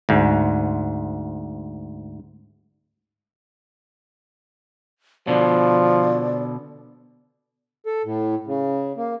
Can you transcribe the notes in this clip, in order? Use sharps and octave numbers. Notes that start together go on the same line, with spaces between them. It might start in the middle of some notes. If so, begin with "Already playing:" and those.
D2 G#2
B2 D3 F3 D5
A4
A2
C#3
A#3